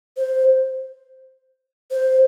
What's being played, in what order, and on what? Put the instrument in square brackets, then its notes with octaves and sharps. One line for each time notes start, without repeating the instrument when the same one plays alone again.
[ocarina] C5
C5